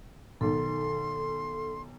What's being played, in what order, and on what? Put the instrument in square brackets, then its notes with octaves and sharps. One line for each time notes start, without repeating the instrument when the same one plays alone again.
[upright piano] B1 D#3 [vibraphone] A4 [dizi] C6